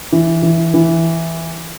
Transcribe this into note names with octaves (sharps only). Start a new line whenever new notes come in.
E3
E3
E3